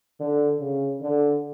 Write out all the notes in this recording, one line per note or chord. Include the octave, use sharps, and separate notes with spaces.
D3
C#3
D3